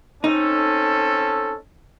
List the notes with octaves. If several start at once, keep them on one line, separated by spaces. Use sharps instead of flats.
C4 C#4 D#4 A4